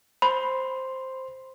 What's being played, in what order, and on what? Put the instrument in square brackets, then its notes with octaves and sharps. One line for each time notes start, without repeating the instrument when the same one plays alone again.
[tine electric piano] C5 C6 [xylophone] B5